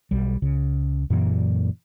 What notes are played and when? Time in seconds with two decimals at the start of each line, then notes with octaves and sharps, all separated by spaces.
0.11 B1 G3
0.42 C#2 C#3
1.10 F#2 A#2 E3 A#3